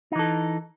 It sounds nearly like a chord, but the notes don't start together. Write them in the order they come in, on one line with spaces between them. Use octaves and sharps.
D#4 E3 A4